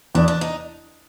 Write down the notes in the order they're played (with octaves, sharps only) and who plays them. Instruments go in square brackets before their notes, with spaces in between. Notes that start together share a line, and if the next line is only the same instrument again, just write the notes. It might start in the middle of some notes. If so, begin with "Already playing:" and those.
[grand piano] E2 [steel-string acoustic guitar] D4
[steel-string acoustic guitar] D4
D#4